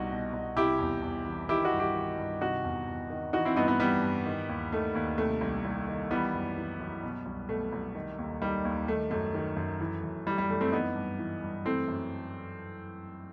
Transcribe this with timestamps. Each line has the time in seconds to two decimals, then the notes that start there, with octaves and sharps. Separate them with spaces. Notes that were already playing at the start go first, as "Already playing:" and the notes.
Already playing: C2 B2 D#4 F#4
0.11 B2
0.33 C2
0.56 C3 E4 G4
0.79 E2
1.02 E2
1.25 E3
1.49 D#3 E4 G4
1.64 D#4 F#4
1.72 G2
1.79 E4 G4
1.95 D#3
2.18 G2
2.41 C3 D#4 F#4
2.64 E2
2.87 E2
3.10 D#3
3.33 E3 D#4 F#4
3.45 C4 E4
3.56 G2 B3 D#4
3.68 B3 D#4
3.80 E3 G3 B3
4.02 G2
4.26 D#3
4.49 D#2
4.72 D#3 A3
4.95 D#2
5.18 C3 A3
5.41 C2
5.65 C2
5.88 D#3
6.11 E3 G3 B3
6.34 F#2
6.57 E3
6.80 F#2
7.03 B2
7.26 C2
7.49 B2 A3
7.73 C2
7.95 D#3
8.19 D#2
8.42 D#3 G3
8.65 D#2
8.88 D#3 A3
9.11 F#2 A3
9.34 D#3
9.57 F#2
9.81 E3
10.04 F#2
10.27 E3 G3
10.38 G3
10.49 F#2 A3
10.61 A3 C4
10.72 E3 B3 D#4
10.96 G2
11.19 E3
11.43 G2
11.65 E3 A3 C4
11.88 F#2